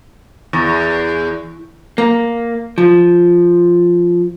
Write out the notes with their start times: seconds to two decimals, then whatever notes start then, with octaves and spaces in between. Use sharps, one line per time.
0.53 E2
1.98 A#3
2.78 F3